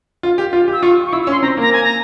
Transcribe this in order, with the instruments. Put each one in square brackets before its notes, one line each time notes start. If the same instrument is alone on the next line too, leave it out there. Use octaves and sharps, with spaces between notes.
[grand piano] F4
G4
F4
G4
[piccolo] E6
[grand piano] F4 [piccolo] C#6
[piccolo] C#6
[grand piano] E4 [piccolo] E6
[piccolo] E6
[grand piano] C#4
[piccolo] C6
[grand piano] C4 [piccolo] A#5
[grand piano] A#3 [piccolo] A#5
[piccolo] G#5
A#5